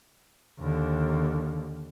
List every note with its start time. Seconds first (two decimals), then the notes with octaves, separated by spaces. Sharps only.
0.60 D#2 D3